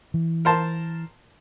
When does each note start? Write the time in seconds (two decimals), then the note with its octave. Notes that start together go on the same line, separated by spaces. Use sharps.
0.14 E3
0.45 A#4 C5 A5